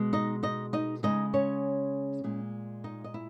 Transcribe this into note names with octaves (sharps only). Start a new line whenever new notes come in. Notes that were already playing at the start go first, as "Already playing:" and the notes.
Already playing: B2 G#3
D#4 D#5
D#4 D#5
D#4 D#5
C#3 G#3 D#4 D#5
C#4 C#5
A#2 G#3
D#4 D#5
D#5
E4